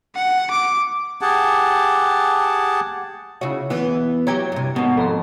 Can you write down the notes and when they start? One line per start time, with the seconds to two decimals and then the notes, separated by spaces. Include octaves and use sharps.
0.15 F#5
0.51 D6
1.21 G4 G#4 F#5 A5
3.41 C#3 E4 F#4 C#5
3.70 E2 E3 B3 E4
4.27 F#3 G4 C#5 A#5 G#6
4.52 G2 C3
4.76 G#2 B2 D#3
4.97 F2 A4 A#5 C6